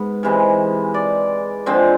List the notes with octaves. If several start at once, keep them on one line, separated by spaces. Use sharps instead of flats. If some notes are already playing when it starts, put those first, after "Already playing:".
Already playing: G#2 B3
C3 E3 G#3
D5
D3 F3 G#3 C4